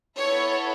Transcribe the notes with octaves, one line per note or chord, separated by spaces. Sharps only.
B3 E4 A4 C#5